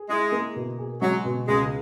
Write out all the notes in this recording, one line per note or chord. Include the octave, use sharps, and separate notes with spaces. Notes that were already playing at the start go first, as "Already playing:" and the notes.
Already playing: G#4
G#3 E4
A#3
B2
G#4
F#3 G#3
B2
C#2 G#3